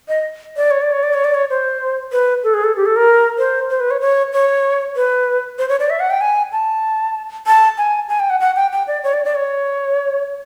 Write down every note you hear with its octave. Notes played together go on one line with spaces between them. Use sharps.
D#5
D5
C#5
D5
C#5
D5
C#5
D5
C#5
C5
B4
A4
G#4
A4
G4
A4
A#4
C5
C5
B4
C#5
C#5
C#5
B4
C5
C#5
D5
E5
F#5
G5
G#5
A5
A5
G#5
G#5
G5
F#5
F#5
G5
G5
D5
C#5
D5
D5
C#5